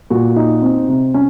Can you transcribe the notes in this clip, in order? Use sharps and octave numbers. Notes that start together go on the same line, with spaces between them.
A#2 F#4
D#4
C4
C3
C#4